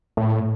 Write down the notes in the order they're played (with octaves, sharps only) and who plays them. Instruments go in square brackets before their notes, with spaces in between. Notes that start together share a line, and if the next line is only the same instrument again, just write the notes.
[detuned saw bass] A2